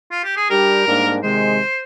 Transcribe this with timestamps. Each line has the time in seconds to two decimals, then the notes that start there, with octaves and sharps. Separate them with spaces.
0.11 F4
0.24 G4
0.37 G#4
0.50 G3 D4 G4 A#4
0.86 G#2 G3 A#3 D4
1.23 C3 D#3 G#3 C5